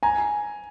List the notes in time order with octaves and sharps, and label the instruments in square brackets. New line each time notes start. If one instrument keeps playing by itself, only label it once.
[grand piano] G#5 A#5